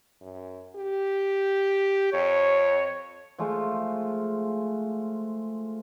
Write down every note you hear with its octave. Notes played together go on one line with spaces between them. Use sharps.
F#2
G4
F2 C#5
F3 G#3 A3 F4